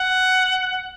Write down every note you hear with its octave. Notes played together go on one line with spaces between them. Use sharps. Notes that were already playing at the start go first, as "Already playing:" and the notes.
Already playing: F#5